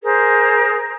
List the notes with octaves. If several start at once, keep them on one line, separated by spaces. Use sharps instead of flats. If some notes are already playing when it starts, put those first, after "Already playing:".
G#4 A#4 C5